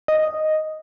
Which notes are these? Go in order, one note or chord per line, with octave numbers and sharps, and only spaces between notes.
D#5